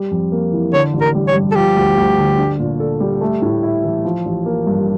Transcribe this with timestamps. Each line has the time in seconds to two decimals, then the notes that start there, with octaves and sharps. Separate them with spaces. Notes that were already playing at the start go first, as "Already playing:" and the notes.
Already playing: G3
0.11 F2
0.32 A#3
0.53 E3
0.73 D3 C#5
0.94 A1
1.01 A#4
1.15 G3
1.28 C#5
1.35 G2
1.51 A4
1.55 F3 G4
1.76 D2
1.97 D2
2.18 D3
2.38 D4
2.59 A#2
2.80 A4
3.00 G3
3.21 A3
3.42 A2
3.63 E4
3.84 E3
4.05 F3
4.26 A1
4.46 A#3
4.67 G2